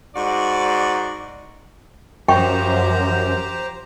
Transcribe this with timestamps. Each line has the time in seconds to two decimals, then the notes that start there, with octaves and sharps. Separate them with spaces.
0.15 G#2 D#4 F#4 D5
2.28 F#2 F3 G4 C5 G5 A#5 C#6